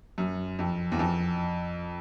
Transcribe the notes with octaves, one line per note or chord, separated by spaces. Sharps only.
F#2
F2
E2
F2